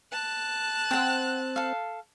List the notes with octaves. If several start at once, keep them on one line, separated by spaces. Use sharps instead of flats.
A5 F#6
C4 F#5 G5
A4 F5